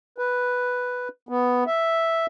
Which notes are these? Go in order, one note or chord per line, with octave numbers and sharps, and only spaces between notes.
B4
B3
E5